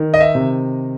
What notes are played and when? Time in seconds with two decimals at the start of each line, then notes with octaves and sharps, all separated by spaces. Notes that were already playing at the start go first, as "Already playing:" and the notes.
Already playing: D#3
0.14 D#5
0.21 E5
0.35 C3